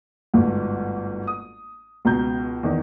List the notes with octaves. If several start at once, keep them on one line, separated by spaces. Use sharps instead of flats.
G1 D2 G#2
D#6
C#2 B2 A#5 G6
E2 D#3